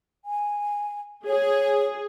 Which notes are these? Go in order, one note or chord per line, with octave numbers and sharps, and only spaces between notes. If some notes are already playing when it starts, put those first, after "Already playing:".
G#5
G#4 C#5